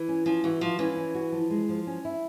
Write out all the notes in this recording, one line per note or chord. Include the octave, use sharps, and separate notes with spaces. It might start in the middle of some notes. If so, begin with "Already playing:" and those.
Already playing: E3
C#4
F3 C#4
E3 F#4
F3 F#4
E3 C#4
C#4
F#4
F3
G#3
F3
C#4
E4